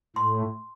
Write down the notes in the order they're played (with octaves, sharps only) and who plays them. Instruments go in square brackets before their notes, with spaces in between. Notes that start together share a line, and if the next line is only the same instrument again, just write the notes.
[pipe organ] A2 [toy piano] C6